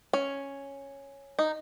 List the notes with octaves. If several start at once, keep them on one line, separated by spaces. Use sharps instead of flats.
C#4
D#4